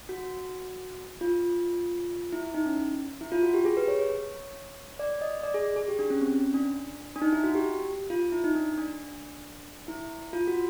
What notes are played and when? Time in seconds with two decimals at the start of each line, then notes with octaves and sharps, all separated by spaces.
0.09 F#4
1.21 F4
2.32 E4
2.44 E4
2.54 D#4
2.66 C#4
3.21 E4
3.32 F4
3.43 F#4
3.54 G4
3.65 G#4
3.77 B4
3.88 C#5
4.00 C#5
4.99 D5
5.21 D#5
5.43 D5
5.54 G#4
5.66 G#4
5.76 G#4
5.88 G4
5.99 D4
6.10 C#4
6.21 C4
6.32 C#4
6.54 D4
7.16 D4
7.22 D#4
7.32 E4
7.44 F#4
7.55 G4
8.10 F4
8.32 E4
8.44 D#4
8.55 D4
8.78 D4
9.88 E4
10.33 F4
10.48 F#4